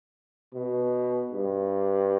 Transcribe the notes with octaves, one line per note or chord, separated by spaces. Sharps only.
B2
G2